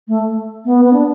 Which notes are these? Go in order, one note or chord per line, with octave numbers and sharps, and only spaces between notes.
A3
B3
B3
D4